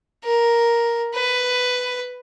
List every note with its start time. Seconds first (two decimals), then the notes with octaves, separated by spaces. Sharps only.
0.24 A#4
1.14 B4